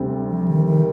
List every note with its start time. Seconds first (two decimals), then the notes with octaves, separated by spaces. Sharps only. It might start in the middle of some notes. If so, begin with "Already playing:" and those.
Already playing: D2 C3 G3 C4
0.30 F3
0.48 D#3
0.67 D#3